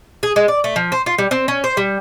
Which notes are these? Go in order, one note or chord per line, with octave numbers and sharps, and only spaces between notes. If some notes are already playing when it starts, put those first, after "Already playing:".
G#4
G#3
D5
A3
F3
C5
F4
G3
C4
C#4
C5
G3